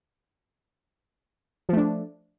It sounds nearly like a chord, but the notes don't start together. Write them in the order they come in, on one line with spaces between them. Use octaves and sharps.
F3 A3 D4